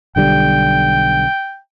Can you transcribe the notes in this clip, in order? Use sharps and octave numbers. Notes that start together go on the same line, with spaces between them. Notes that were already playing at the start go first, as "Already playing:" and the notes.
B1 D3 G3 G5